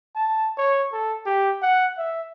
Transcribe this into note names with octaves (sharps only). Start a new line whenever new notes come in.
A5
C#5
A4
G4
F#5
E5